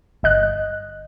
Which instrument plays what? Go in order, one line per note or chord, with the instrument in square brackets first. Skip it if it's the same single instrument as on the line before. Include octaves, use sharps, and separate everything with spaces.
[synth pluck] G1 D#5 F#6